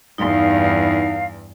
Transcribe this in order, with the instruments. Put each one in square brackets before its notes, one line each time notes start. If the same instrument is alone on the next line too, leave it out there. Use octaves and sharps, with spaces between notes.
[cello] E2 G2 [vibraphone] D#4 [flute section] F5